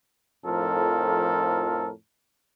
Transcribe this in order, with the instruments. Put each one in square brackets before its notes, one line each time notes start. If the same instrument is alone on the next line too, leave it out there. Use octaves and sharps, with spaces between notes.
[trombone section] F2 A2 F3 D#4 A4 A#4